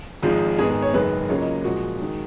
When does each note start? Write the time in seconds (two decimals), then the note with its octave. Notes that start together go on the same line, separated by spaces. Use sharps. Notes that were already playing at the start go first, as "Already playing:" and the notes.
0.23 G#1 G#2 F3 G#3 D#4 F4
0.58 G#2 D#3 G#3 B3 G#4
0.70 G#4
0.82 C#5
0.93 F#1 F#2 D#3 G#3 B4
1.29 C#2 C#3 F#3 A#3 F4 C#5
1.42 D#5
1.64 A#2 F3 G#3 F#4
2.00 D#3 G#3